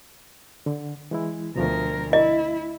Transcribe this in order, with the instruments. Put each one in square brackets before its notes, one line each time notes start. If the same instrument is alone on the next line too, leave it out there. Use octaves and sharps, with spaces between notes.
[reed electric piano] D3
E3 G#3 E4
[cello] D2 A#4 [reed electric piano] B2 F3 A3
[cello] E4 [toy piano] D#5